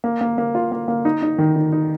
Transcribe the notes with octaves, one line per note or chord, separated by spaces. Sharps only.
A#3
A#3
A#3
F4
A#3
A#3
D#4
D#4
D#3
D#4
D#4